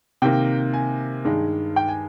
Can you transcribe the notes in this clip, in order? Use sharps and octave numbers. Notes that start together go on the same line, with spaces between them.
C3 D#3 A#3 G5
G#5
G2 D#3 G#3
G5
G#5